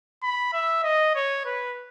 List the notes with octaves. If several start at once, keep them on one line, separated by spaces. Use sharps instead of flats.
B5
E5
D#5
C#5
B4